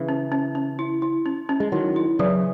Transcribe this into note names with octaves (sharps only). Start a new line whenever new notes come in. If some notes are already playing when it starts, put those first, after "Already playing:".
Already playing: C#3 E3
C#4
C#4
C#4
E4
E4
C#4
C#4
G#3
D#3 F#3 E4
E4
C#3 E3 F#3